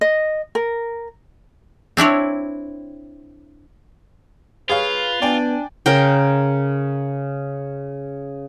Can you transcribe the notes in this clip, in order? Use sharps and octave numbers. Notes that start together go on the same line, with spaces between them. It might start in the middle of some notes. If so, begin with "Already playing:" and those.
D#5
A#4
C4 D4 E4 C#5
F4 G#4 B4 C#5 F5
B3 D4 D5 G5 G#5
C#3 A#4 G5